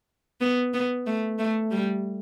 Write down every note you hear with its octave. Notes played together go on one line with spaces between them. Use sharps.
B3
B3
A3
A3
G3